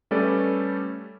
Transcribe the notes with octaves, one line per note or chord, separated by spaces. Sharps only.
G3 A3 C#4 A4 B4 D5